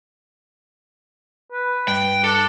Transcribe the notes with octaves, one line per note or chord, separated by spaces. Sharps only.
B4
G2 G5
D4 A4